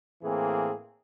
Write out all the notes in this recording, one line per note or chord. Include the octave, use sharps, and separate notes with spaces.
A2 E3 A#3 C4 G#4